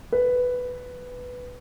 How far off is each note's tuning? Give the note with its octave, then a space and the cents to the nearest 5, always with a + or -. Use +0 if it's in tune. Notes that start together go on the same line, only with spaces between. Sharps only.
B4 +5